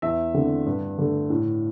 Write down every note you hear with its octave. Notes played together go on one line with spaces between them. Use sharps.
E2 E5
D3 A3 C4
G2
D3 A3
A2